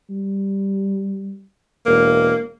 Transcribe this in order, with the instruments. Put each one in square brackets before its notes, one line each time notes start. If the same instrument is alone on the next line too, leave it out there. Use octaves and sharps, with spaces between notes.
[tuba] G3
[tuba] E1 [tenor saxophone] A#3